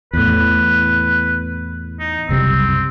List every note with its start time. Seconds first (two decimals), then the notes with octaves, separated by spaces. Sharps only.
0.13 E2 A2 B4
2.00 D#4
2.29 F#1 C2 C3 C4